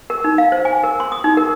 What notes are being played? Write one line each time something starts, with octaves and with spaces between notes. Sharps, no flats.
A#4
D#4
F5
C5
G#5
A#4
C6
D#6
D#4
A#4